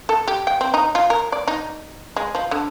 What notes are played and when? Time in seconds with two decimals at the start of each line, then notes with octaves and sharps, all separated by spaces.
0.09 A4
0.28 G4
0.47 G5
0.61 C4
0.74 D#4
0.95 F4
1.10 A#4
1.32 D5
1.47 D#4
2.16 G#3
2.35 F3
2.51 D3